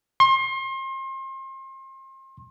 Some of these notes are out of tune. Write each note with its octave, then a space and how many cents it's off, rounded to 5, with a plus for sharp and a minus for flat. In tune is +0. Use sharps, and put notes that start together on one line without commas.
C6 +35